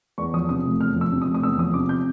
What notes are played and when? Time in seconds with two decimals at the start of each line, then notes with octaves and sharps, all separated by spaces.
0.18 E2 C#6
0.34 F3 D#6
0.49 C3 D#6
0.65 F1
0.80 E2 F6
0.96 F3
1.01 E6
1.12 C3
1.22 D#6
1.28 F1
1.34 D#6
1.43 E2 E6
1.58 F3 D#6
1.74 C3 D6
1.89 G6